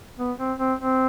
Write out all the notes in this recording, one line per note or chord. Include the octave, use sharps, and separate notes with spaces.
B3
C4
C4
C4